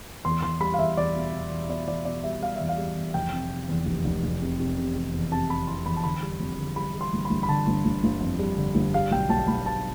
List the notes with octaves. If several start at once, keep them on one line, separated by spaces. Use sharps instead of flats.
E2 C6
E2 C6
G3 B5
F5
E2 E5
E2 D5
B2
B2
E2
B2 D5
E2 D5
B2 D5
G3 E5
G3 F5
E2 E5
F5
G3
E2
F1 G5
C3
C3
E2
F1
F1
F1
C3
C3
C3
C3
E2
C3 A5
C3 B5
E3 C6
E2 B5
A5
D3 B5
G3
F2
D3
G3 B5
G3
C6
G1
B5
G1
B5
D3 A5
G1
G1
G1
F2
G3
D3
G1
G3 F5
B1 G5
B1 A5
B1 B5
G3 A5